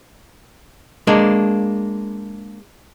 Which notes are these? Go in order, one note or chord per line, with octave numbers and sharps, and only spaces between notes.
G#3 A#3 D4